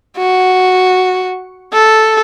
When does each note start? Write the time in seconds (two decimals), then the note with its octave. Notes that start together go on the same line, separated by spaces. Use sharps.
0.17 F#4
1.73 A4